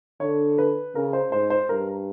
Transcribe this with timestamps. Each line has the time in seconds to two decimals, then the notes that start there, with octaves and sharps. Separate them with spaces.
0.20 D3 C#5
0.58 B4
0.95 C#3 A#4
1.13 C5
1.32 G#2 C5
1.50 C5
1.69 G2 A#4